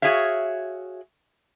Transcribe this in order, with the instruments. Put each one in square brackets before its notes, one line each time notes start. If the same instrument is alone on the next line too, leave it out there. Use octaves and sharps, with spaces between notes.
[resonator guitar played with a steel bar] F#4 G#4 C#5 E5 F5